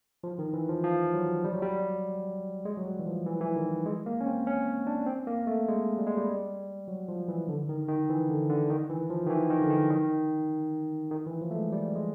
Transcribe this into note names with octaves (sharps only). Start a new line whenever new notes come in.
F3
D#3
E3
F3
F3
F#3
G3
F#3
G3
G#3
F#3
G3
E3
F3
E3
E3
D#3
G#3
A#3
C#4
C4
C#4
D4
C4
A#3
A3
G#3
G3
G#3
G3
F#3
F3
E3
D3
D#3
D#3
E3
D3
D3
D#3
E3
F3
D#3
E3
D#3
D3
D#3
D#3
D#3
E3
F3
A3
G#3
G3
G#3